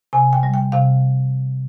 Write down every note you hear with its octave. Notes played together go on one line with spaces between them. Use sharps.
C3 G#5
G5
G3
G5
C3 F5